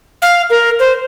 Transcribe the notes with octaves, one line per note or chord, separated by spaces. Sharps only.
F5
A#4
C5